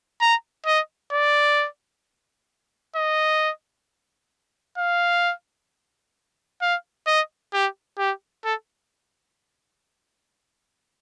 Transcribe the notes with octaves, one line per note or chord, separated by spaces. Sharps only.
A#5
D#5
D5
D#5
F5
F5
D#5
G4
G4
A4